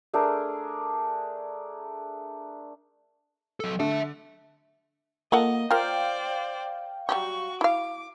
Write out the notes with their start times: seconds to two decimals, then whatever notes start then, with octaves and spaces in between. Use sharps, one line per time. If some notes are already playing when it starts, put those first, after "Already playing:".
0.13 A3 D4 G#4 A#4
3.60 F#3 A4
3.80 D3 E5 A5
5.32 A#3 F4 A4 D#5 F#5
5.71 F4 A#4 C5 D5 F5 G5
7.09 F#3 G3 F#4 G4 C#6
7.61 E4 F5 D6